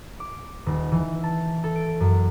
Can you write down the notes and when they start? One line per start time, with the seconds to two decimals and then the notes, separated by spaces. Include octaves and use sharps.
0.20 D6
0.66 D#1
0.92 E3
1.24 A5
1.64 A4
1.76 D7
2.00 F#2